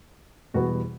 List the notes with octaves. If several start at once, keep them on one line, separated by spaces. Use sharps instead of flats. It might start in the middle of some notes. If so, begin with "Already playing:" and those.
E2 B2 G3 B3 F#4